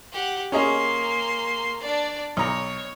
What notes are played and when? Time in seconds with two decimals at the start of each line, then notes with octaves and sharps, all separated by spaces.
0.12 G4 F#5
0.52 A#3 C#4 G#4 D#5 C6
1.81 D4 D5
2.37 B1 C#5 A#5